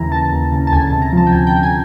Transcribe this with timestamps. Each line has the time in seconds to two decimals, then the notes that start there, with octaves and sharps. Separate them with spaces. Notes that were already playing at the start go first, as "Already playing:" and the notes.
Already playing: D#2 C#3 E3 A#5
0.12 D#2 A5
0.33 D#2
0.52 C#3
0.67 A5
0.72 D2 G#5
0.87 A5
0.92 C3
1.02 A#5
1.13 F3 A5
1.27 G5
1.32 D2 G#5
1.47 G5
1.52 D2
1.63 G#5